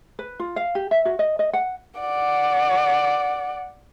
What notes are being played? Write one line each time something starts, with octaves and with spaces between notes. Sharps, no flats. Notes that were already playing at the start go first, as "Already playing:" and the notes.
B4
F4
F5
G4
E5
F#4
D#5
D#5
F#5
D5 F#5